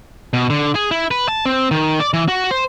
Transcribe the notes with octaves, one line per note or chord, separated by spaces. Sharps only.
B2
D3
G#4
E4
B4
A5
C4
D#3
D5
E3
F#4
C5